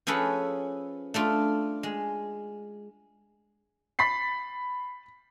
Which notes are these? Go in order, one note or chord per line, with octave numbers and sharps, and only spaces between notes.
F3 C#4 G#4 A4 B4
A3 D4 F4
G#3
B5 A6 B6 C7